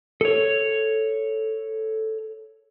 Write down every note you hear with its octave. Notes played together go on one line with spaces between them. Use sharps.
A4 C#5